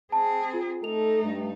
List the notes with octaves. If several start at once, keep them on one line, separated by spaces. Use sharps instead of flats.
C4 G#4 A5
F4
A3 D#4 A4 F7
G2